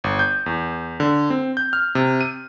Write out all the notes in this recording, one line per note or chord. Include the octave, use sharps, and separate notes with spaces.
G1
G6
E2
D3
C4
G6
F6
C3
D#7